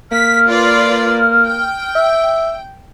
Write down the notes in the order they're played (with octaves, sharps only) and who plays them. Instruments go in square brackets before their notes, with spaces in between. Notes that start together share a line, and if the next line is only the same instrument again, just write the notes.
[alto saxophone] A#3 [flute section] F6 [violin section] B6
[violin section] F4 B4 D5
G5
[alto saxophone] E5